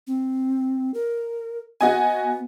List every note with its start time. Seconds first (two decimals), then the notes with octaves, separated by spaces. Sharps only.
0.07 C4
0.94 A#4
1.81 B3 F#4 D#5 G#5